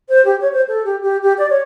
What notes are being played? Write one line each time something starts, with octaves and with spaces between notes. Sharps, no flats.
C5
G4
C#5
C5
A4
G4
G4
G4
D5
C#5